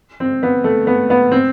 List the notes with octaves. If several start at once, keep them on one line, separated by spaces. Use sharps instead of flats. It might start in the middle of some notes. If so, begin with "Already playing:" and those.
C4
B3
A3
B3
B3
C4